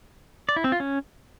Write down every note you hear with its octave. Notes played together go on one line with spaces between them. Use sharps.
D5
E4
C4
F4
C#4